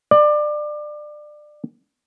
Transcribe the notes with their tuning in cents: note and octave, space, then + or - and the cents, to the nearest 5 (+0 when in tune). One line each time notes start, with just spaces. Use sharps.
D5 +25